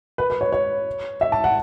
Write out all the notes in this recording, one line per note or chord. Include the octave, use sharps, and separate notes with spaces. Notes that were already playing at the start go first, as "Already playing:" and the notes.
B4
B4
C#5
C#5
E5
A5
F#5